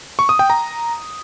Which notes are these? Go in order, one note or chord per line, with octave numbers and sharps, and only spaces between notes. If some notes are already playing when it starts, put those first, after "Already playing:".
C#6
D#6
G5
A#5